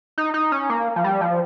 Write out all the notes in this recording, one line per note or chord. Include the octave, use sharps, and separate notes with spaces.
D#4
D#4
C#4
A#3
F3
G3
F3